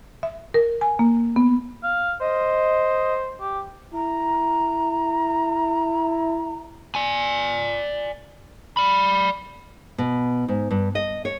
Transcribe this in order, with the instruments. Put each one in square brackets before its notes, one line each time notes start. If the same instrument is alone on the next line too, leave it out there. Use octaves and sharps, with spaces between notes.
[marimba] E5
A#4
G#5
A#3
B3
[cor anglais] F5
[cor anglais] C5 [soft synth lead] D#5
[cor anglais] G4
[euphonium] E4 [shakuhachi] A#5
[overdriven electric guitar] D5 G#5
D5 B5
[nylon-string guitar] B2
G#2
G2
D#5
C#5